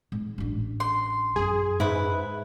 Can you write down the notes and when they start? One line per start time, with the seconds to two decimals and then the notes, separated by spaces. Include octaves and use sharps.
0.12 G#2
0.38 A1 D4
0.80 C6
1.36 F#2 G#4
1.80 G#2 E4 B4